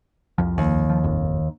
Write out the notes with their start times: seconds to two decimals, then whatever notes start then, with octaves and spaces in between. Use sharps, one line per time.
0.38 C2 F2 F3
0.58 D#2
0.90 F3
1.04 D#1 G#1 F2